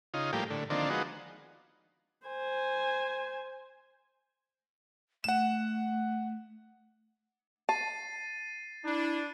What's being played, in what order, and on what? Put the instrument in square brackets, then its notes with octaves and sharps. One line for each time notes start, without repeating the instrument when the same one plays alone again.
[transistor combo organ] C#3 D#4 F4
A2 F3 G3 A#3 G4
A2 D3
D3 D#3 F3 A#3 C4 D4
F3 G#3 B3 D#4 F#4
[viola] C5 G#5
[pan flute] A3 [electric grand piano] F#5 E7
[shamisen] A5 [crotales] A6 C7 D#7
[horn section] D4 [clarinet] E4